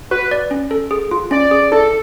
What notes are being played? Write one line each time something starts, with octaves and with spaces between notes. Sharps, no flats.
F#4 B4
D5
C#4
A4
G#4
F4
C#4 D5
G#4
E4 A4